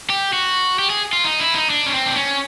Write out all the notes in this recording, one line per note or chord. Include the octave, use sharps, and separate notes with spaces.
G4
F#4
G4
G#4
F4
D#4
E4
D#4
D4
C#4
C4
D4
C#4